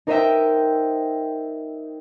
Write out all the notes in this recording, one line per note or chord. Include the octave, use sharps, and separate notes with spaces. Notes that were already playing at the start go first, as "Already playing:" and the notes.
D#4 A#4 C5 D#5 E5 G5